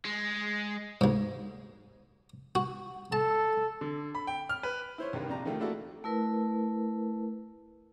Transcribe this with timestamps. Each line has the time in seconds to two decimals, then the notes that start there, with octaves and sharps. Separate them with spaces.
0.05 G#3
1.01 D2 G#2
2.55 F#4
3.12 A4 A5
3.81 D3
4.15 B5
4.27 G5
4.49 F6
4.63 B4
4.98 E4 C5 C#5
5.13 C2 G2 D#3 G3
5.29 A#1 C3 D5 A#5
5.45 C3 D#3 F3 A3
5.60 A3 A#3 D4 E4 F#4 A4
6.04 A3 E4 A#4 B4